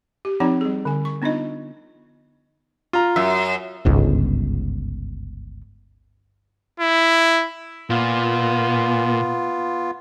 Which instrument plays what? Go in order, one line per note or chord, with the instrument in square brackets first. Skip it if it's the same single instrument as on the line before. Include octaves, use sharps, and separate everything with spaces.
[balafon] G4
F3 C4 D#4 D5 A#5
G3 G#4
D3 G#5
C#6
B3 D4 D#4 F4 D#5
[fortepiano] F4 A#5
[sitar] F#2 [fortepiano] E5
[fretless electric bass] G1 C#2 G#2
[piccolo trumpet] E4
[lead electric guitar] A#2 [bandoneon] B3 F4